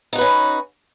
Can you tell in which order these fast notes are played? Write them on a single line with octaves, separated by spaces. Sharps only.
D#4 F#4 B4 C#4